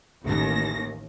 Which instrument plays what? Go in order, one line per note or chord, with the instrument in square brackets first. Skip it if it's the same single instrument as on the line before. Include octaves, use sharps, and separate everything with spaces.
[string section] A1 D#2 A#6